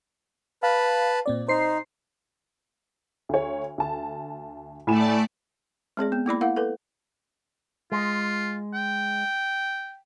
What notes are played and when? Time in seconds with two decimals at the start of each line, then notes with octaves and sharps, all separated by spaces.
0.63 B4 F5 A5 B5
1.26 A#2 C4 D5
1.48 D#4 C5 C7
3.29 D2 C#5
3.78 D2 A5
4.87 A2 A3 D5 G#5 A5 E7
5.97 G#3 C4 G#4 D5
6.12 B3
6.26 A#3 E4 D5 B5
6.41 E4 A#4 F5 F#5
6.56 A4 B4
7.92 G#3 F4
8.74 G5